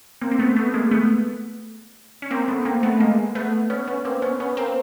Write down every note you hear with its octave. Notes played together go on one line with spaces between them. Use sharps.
A#3 C4
C4
A3 B3
A3 B3
G#3 A#3
A3 B3
C#4
A#3 C4
A3 B3
A#3 C4
A3 B3
G#3 A#3
A3 B3
B3 C#4
B3 C#4
A#3 C4
B3 C#4
B3 C#4
A#3 C4